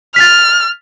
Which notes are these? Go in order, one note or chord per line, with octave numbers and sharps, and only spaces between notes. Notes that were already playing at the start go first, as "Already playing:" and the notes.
F6 A6 B6